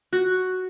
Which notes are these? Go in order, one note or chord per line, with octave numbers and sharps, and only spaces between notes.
F#4